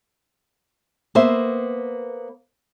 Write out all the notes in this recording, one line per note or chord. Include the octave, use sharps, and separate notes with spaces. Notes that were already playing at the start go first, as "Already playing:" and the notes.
A#3 B3 C5 E5